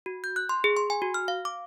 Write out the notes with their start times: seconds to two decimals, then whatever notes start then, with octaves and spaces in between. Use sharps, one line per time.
0.06 F#4
0.24 G6
0.36 F#6
0.49 C6
0.64 G#4
0.77 C6
0.90 G#5
1.02 F#4
1.14 F6
1.28 F5
1.45 D6